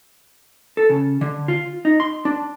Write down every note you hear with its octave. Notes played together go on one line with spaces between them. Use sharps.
A4
C#3
D3
F4
D#4
C6
D4